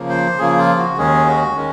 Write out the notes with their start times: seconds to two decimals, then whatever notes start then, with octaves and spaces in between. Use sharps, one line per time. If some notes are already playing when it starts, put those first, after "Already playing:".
Already playing: C#3 F3 A#3
0.09 C5
0.38 C#3 F3 A#3 G#4
0.58 F4
0.77 F#4
0.97 D#2 D#3 G#3 C#4 G#4
1.26 F#4
1.55 D#3 G#3 C#4